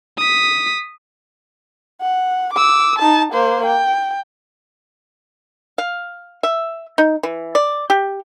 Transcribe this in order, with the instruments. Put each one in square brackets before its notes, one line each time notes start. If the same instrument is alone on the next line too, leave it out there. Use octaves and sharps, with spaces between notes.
[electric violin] D#6 B6
[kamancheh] F#5
D6 E6
D#4 A5
A#3 C5
G5
[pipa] F5
E5
D#4
E3
D5
G4